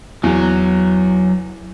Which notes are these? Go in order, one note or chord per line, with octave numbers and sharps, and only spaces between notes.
E2 F#3